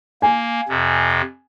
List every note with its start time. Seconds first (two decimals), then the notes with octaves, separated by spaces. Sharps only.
0.22 A#3 G#5
0.69 F2 C3